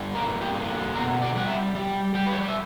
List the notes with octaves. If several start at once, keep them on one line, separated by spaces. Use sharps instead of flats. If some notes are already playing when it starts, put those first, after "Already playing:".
Already playing: G2 D3
A#3 A#4
G4
D3
B2 A#4
D5
G3 F#5
E5
G3
G3 G5
B4
C#5
D5
E5